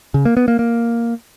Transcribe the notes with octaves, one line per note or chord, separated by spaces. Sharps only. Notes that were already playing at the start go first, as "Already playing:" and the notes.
C#3
A#3
B3
A#3
A#3